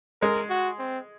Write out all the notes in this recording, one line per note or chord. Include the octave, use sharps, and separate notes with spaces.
G#3 A#4
F#4
C4